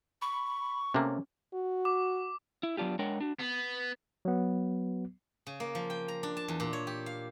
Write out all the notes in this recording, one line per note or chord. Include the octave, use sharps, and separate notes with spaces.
B5 C#6
C3 A3 A#3 C#4
F#4
D6
E4
F#3 B3 D4 F4 G4
G#3 D4 A#4 C#5 F#5 G5
D4 F#4
B3
F#3 B3
C#3
A#3
F3
G5
A#5
D4
A5
E2
A#2
C#5
G4
F5